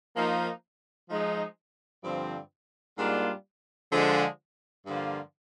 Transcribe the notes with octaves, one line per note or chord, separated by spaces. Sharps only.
F3 A#3 D#4
F3 G#3 D#4
G2 D3 F3 C4
G#2 G3 A#3 D4 F4
D3 F3 G#3
G2 D3 F3 A#3 F4